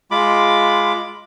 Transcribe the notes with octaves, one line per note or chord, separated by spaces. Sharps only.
G#3 F4 B5 D6